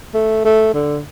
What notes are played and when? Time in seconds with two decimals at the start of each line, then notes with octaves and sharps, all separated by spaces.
0.14 A3
0.45 A3
0.74 D3